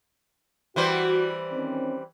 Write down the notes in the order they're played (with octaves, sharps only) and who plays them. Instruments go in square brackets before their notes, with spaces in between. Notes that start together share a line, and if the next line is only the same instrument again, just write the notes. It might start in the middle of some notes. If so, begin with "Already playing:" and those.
[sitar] E3 G3 C5 [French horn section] F#4
[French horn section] D#3 C4 C#4